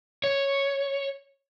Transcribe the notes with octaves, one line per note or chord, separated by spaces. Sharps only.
C#5